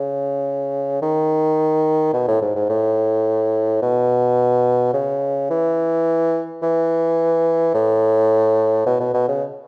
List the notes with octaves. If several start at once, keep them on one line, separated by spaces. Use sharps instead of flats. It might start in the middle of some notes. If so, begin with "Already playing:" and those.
Already playing: C#3
D#3
B2
A2
G#2
G#2
A2
B2
C#3
E3
E3
A2
B2
B2
B2
C#3